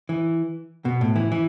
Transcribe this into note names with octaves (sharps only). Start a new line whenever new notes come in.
E3
B2
A2
E3
E3